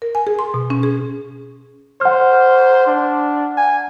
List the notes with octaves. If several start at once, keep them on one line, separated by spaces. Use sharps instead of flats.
A#4
G#5
G#4
C6
B2
C#4
G#4
C5 F#5 F6
D4
G#5